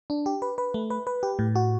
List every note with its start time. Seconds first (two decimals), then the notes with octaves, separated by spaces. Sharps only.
0.10 D4
0.26 G4
0.42 B4
0.58 B4
0.74 A3
0.90 B4
1.07 B4
1.23 G4
1.39 A2
1.56 F#4